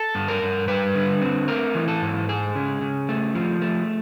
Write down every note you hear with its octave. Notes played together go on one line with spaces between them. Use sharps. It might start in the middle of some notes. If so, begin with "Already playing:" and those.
Already playing: A4
G2
A#4
G2
G3 B4
D3
C4
A3 A#4
E3
A4
G#2
G#3 G#4
C#3
C#3
A3
F3
A3